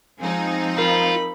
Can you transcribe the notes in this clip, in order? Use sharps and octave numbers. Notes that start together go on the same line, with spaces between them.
F3 G#3 C4 D#4 G#5
F4 A#4 B5